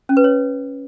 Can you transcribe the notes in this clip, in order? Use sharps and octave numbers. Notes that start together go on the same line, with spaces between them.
C#4
B4
C#5